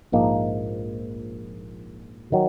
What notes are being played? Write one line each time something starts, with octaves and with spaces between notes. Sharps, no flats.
A#1 G#2 F3 A#3 D#4
D#3 F#3